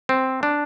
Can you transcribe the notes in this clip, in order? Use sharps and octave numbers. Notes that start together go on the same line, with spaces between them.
C4
D4